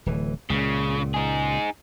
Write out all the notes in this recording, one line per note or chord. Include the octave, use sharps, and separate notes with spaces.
D1 E3
C#2 A#2 C#3
D#4 G#4